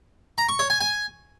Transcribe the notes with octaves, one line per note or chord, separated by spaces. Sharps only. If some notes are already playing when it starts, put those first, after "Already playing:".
A#5
C#6
C#5
G#5
G#5